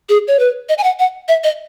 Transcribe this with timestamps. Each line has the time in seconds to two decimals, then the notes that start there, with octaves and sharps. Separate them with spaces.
0.09 G#4
0.28 C#5
0.39 B4
0.69 D#5
0.78 G#5
0.84 F#5
0.99 F#5
1.28 E5
1.44 D#5